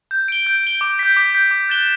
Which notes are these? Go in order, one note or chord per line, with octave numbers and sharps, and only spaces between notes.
G6
D7 G7
G6
D7 G7
D6
G6 B6
D6
G6 B6
D6
F#6 A6 E7 G7